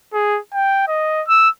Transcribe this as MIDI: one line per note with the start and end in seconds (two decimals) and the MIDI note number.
0.13 0.39 68
0.53 0.85 79
0.88 1.22 75
1.28 1.49 88